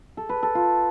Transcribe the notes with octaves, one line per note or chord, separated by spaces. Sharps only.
A4
B4
A4
F4